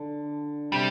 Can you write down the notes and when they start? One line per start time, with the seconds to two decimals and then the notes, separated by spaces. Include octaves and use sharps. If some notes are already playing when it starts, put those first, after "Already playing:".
Already playing: D3
0.72 C3 G3